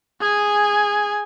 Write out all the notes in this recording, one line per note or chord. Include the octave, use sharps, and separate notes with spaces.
G#4 G#5